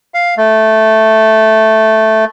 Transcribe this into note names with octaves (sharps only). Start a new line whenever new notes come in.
F5
A3